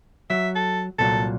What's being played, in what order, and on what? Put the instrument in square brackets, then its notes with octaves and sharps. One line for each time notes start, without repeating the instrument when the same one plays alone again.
[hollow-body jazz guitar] F#3 [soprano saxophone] E5
[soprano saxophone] A4
[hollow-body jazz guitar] C2 A#2 F#3 [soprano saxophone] A4